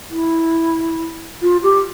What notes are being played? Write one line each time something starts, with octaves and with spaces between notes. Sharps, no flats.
E4
F4
G4